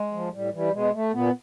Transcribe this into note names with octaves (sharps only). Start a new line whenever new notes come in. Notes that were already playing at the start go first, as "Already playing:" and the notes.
Already playing: G#3
F3
A2 G3
E3 G3
B2 G#3
A3
A#2 B3